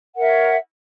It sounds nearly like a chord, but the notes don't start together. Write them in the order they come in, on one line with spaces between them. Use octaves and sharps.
F#5 A#4 E5 C#5